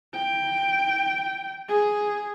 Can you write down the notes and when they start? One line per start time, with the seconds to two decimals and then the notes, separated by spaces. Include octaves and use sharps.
0.15 G5
1.69 G#4